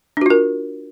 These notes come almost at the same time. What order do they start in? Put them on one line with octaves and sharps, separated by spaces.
D4 F#4 F4 A#4